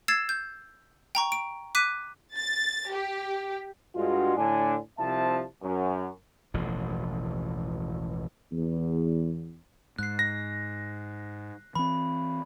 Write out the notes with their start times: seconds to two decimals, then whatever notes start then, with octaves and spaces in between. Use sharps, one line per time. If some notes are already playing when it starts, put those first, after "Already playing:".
0.08 E6 G#6 A6 C7 E7
0.29 G6
1.15 G5 A#5 C#6
1.32 D7
1.75 D6 F#6 B6 D#7
2.35 A6
2.93 G4
3.95 G2 G#3 F4 F#4
4.37 A2 D3 D4 G#5
4.98 C2 C3 F3 C4 E5 A5
5.63 F#2
6.54 E1 A1 B2 F3
8.53 E2
9.99 G#2 F#6 C7
10.19 A#6
11.75 E3 C4 B5